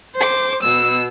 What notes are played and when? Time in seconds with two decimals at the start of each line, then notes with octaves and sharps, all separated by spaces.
0.16 C5 D6
0.62 B2 E6